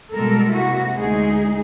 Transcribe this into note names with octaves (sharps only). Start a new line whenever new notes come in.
B2 G3 G#3 A#3 A4 A#4
C3 A#3 E4 F#4
D2 G#3 D#4 G#4